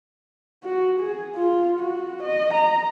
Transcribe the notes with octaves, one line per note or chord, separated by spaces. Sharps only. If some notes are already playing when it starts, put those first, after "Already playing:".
F#4
G#4
F4
F#4
D#5
A#5